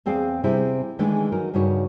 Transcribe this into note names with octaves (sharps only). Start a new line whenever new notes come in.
E2 C4 G#4 D5 F5
C3 G3 C4 E4 G#4
D#3 E3 G#3 A3 D4
F#3 D#4 A#4
G2 C#3 D#4 F#4 C#5